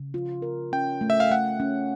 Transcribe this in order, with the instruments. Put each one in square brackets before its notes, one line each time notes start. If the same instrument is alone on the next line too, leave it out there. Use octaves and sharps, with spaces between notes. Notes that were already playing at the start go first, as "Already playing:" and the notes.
Already playing: [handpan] C#3
F4
A#4
[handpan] C#4 [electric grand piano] G5
[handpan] A3
[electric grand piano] E5
F5
[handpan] A3 [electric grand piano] F#5
[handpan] C#4